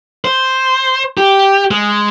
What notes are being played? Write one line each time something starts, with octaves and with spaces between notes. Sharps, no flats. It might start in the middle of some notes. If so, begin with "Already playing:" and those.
C5
G4
G#3